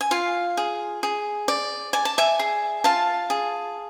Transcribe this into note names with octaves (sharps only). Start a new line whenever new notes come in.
G#5
F4 F5
G#4
G#4
D5
D5 G#5
A5
E5 G#5
G#4
F4 F5 A5
G#4